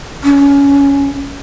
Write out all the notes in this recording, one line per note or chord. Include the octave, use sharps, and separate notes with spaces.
C#4